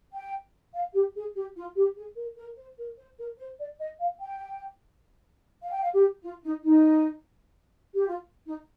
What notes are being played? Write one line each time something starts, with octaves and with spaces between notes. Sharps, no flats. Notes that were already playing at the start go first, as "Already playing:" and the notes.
G5
F5
G4
G#4
G4
F4
G4
G#4
A#4
A#4
C5
A#4
C5
A#4
C5
D5
D#5
F5
G5
F5
G5
F5
G4
F4
D#4
D#4
G4
F4
D#4